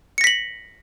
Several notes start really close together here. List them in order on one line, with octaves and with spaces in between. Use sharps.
C#7 A#6 B6 F#7